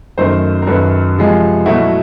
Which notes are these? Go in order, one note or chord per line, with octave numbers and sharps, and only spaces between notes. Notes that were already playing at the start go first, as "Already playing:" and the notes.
F#2 D#3 F#3 A3 A#4 C5
A#4
F#2 D#3 F#3 A4 B4
C3 F3 G#3
B2 F#3 A3 E4 F#4